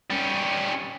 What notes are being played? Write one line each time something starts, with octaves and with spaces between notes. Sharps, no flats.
G3 C#4